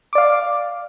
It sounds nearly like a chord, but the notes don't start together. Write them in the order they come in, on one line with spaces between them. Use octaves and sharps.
D6 D5 F5